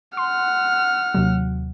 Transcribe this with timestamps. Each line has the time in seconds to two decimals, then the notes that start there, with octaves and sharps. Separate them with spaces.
0.17 F#5 C6 F6
1.14 D#2 C3 F#3